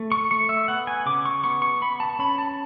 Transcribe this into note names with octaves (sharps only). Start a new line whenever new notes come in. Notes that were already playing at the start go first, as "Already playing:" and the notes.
Already playing: A3
C#6
A3 C#6
E5
B3 F#5
G#5
C#3 D6
C#6
B3 C#6
C#6
B3 B5
A5
C#4 B5
A5